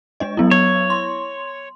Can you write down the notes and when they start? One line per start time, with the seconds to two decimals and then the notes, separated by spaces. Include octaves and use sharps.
0.20 G#3 D4 D#5
0.37 F#3 B3 E4
0.51 C#5
0.90 C6